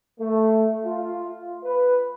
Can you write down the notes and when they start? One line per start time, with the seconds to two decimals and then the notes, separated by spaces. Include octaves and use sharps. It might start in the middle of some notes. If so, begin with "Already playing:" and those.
0.20 A3
0.86 F4
1.64 B4